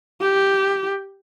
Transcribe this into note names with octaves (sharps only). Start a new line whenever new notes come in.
G4